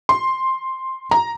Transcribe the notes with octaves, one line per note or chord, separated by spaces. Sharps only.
C6
A#5